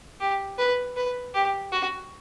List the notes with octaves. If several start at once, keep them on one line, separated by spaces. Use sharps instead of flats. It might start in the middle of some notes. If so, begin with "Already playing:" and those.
G4
B4
B4
G4
F#4